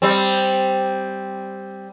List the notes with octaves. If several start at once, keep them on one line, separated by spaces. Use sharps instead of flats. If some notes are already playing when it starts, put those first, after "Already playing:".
G3 C4